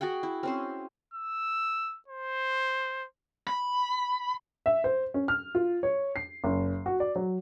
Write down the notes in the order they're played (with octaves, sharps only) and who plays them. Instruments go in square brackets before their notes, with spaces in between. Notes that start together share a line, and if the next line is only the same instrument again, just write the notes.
[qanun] F#4 G#4 F#5 G5
E4
C4 C#4 C5
[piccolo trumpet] E6
C5
[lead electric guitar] B5
[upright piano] E5
C5
C#4
F6
F4
C#5
C7
F#1
F#4
D5
F#3